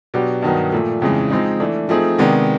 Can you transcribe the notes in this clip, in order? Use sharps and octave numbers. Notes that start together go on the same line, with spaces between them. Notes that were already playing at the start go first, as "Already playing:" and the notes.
B2 F#3 B3 D4 G4
G2 D#3 F#3 B3 D#4
A#2 F3 A3
F2 C#3 E3 G#3
F3 G#3 C4 D#4
E3 A3 D4
F3 A3 C4 D#4 G#4
C3 D#3 G#3 B3 D4